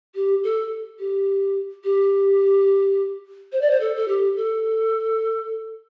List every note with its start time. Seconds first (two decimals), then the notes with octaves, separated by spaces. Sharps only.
0.15 G4
0.44 A4
0.99 G4
1.84 G4
3.52 C5
3.62 D5
3.71 C5
3.80 A4
3.96 A4
4.08 G4
4.36 A4